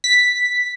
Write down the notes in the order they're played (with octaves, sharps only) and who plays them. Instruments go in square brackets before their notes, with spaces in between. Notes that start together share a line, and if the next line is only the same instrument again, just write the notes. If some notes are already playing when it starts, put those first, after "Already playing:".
[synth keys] B6